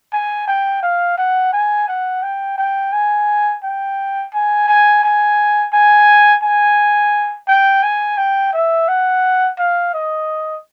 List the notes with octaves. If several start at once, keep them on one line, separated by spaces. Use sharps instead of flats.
G#5
G5
F5
F#5
G#5
F#5
G5
G5
G#5
G5
G#5
G#5
G#5
G#5
G#5
G5
G#5
G5
E5
F#5
F5
D#5